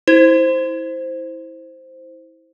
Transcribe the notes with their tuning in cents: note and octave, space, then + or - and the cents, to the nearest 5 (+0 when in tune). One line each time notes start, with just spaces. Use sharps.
E4 -20 C5 +0